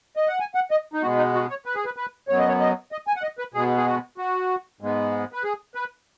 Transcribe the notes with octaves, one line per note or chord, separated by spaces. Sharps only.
D#5
F#5
G#5
F#5
D#5
D#4
B2 G#3 B3 F#4
D#4
F#4
C#5
B4
G#4
B4
B4
F#2 F#3 B3 C#5
D#5
C#5
D#5
D#5
G#5
F#5
D#5
B4
B2 G#3 B3 G#4
G#4
F#4
F#4
G#2 G#3 B3
B4
G#4
B4